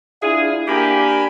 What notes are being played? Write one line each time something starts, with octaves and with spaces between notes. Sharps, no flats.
D4 E4 F4 G#4
A#3 D4 G4 G#5 B5